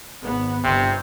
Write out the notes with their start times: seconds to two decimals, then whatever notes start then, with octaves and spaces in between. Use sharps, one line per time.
0.23 G#1 B3
0.64 G1 C3